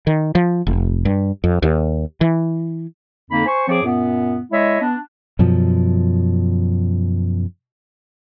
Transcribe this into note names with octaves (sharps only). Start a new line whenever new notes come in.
D#3
F3
F1
G2
F2
D#2
E3
F2 D3 A#3 D#4 B5
C5 G#5 C#6
F3 C4 G#4 C#5 D6
F#2 A#2 B3
G#3 E4 C#5 D#5 E5
B3 D4
F#2 B2 F3